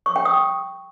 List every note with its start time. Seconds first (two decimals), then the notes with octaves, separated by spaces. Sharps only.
0.06 C#6
0.16 G5
0.25 D#6